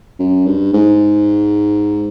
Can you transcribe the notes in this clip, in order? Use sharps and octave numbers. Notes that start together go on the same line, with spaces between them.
F#2
G2
G#2